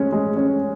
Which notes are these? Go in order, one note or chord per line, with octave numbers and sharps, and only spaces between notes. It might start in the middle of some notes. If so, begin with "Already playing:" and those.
Already playing: G#3 C#4
G#3
C#4